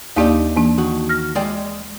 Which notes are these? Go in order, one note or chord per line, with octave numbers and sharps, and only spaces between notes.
D#2 A#3 D4 D#4 G4 D5
E3 A#3 D4
D#3 F#4
F6 A#6
G#3 D5 G5